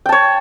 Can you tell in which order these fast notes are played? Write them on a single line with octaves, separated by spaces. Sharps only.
G5 A5 C#5